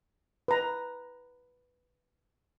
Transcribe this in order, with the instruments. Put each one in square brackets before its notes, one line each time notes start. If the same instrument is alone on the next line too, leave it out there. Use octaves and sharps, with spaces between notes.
[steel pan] B4 A#5